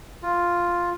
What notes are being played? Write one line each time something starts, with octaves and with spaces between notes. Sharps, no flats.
F4